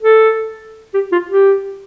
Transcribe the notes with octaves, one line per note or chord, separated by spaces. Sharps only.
A4
G4
F4
G4